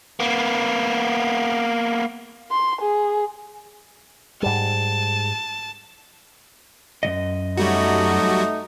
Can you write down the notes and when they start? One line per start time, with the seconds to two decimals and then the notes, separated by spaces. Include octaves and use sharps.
0.20 A#3 B3
2.51 C6
2.82 G#4
4.43 G#2 G3 A5
7.03 F#2 D#3 D#5
7.58 F#3 G3 A3 D#4 F#4